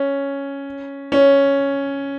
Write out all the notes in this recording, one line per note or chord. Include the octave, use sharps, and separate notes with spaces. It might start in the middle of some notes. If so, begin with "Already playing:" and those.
Already playing: C#4
C#4